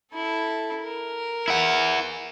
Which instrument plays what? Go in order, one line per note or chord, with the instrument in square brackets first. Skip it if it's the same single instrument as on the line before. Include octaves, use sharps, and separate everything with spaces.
[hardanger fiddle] E4 A4
A#4
[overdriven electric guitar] E4 F#5